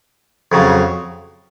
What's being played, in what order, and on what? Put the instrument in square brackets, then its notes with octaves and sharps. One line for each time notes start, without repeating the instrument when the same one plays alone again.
[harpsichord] F2 C#3 F#3